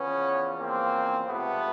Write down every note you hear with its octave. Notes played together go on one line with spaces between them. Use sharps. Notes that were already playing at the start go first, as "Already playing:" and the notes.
Already playing: E2 C#3 F3 B3 C#4
A#3 C4
C#2 C3 F3 A3 B3